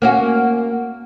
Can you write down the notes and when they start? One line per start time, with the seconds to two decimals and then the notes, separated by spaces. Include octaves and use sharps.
0.02 A#3 C#4 F#4